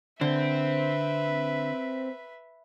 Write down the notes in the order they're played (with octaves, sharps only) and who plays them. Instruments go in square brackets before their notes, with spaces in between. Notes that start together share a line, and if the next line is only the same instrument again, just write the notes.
[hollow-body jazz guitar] D3 [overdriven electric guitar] C4 [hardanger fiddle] B4 E5